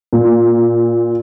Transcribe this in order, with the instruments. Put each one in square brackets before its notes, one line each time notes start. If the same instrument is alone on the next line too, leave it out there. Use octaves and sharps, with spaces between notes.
[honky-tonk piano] A#2